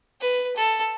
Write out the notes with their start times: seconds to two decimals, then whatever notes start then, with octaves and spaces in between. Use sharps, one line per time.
0.21 B4
0.56 A4